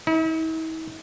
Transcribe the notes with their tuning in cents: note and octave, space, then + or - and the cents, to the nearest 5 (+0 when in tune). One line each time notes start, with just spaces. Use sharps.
E4 -45